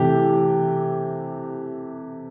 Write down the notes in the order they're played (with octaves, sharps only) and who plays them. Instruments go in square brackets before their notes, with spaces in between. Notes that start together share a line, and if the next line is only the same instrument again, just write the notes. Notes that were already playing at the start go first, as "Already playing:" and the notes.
Already playing: [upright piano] C3 E3 A3 [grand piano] G4